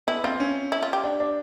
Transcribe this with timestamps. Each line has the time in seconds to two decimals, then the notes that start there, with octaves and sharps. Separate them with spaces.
0.07 B3 E4
0.24 C4 F4
0.40 C#4
0.72 E4
0.83 F4
0.93 G4
1.04 D4
1.20 D4